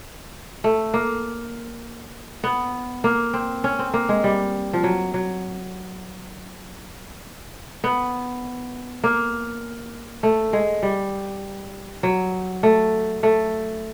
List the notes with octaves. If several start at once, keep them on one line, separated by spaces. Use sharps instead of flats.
A3
A#3
B3
A#3
C4
C#4
C4
A#3
G#3
G3
F3
F#3
F#3
B3
A#3
A3
G#3
G3
F#3
A3
A3